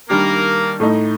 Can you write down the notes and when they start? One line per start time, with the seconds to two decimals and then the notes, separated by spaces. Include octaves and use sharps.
0.10 D#3 G3 A#3 D4 G4 A#4
0.80 A2 A3 D#4